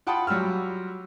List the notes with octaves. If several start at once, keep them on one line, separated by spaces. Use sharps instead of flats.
F4 F#5 G5 A5 B5 D#6
F#3 G3 F4 E6 F6